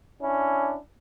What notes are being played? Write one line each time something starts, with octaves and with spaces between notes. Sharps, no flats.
C#4 D4 E4